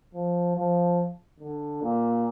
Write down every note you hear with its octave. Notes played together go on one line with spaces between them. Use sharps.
F3
F3
D3
A#2